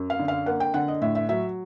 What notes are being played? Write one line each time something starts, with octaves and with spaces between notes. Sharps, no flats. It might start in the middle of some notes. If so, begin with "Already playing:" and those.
Already playing: F#2
F5
D3
F5
A#3 F#5
G5
D3 F#5
D#5
A2 E5
E5
F#3 E5